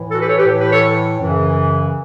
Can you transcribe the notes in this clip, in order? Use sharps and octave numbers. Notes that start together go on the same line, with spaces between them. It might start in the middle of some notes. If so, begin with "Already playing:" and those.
Already playing: A2 E3
F#4 A4
G4 B4
A4 C#5
G4 B4
A2 E3
G4 B4
A4 C#5
F#2 C#3 E3